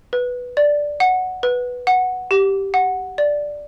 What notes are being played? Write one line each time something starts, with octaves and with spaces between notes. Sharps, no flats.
B4
D5
F#5
B4
F#5
G4
F#5
D5